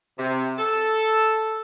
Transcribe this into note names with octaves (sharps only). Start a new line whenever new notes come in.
C3
A4